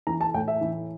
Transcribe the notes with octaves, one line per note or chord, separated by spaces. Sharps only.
E3 A#5
A5
A2 G5
E5
E3